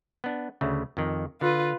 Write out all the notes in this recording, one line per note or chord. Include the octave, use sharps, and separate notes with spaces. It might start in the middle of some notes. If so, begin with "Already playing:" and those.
B3 D4
D2 C#3 A3
F2 D#3
D3 F4 B4